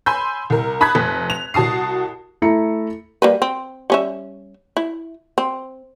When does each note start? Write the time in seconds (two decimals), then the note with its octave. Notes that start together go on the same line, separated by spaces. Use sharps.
0.06 G#5 B5 C6 E6 G6
0.50 C2 A#4
0.81 A5 B5 D#6 F#6 G#6 B6
0.95 F1
1.30 F7
1.54 C2 F#4 A5 D#6 C7
2.42 A3 E4 A4 A#5 C#7
3.22 G3 A#3 B4
3.42 C4
3.90 G3 C#4 E5
4.77 E4
5.38 C4